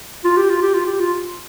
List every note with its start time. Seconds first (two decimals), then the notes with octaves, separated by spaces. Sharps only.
0.24 F4
0.37 G4
0.50 F4
0.62 G4
0.74 F4
0.86 G4
1.00 F4